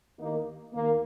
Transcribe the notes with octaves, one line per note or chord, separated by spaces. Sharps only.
D#2 D#3 A#3 D#4
D#2 A#3